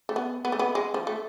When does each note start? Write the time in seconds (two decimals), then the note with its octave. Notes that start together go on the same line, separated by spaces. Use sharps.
0.09 A3
0.16 B3
0.45 B3
0.52 A3
0.59 B3
0.75 G#3
0.94 F3
1.07 A3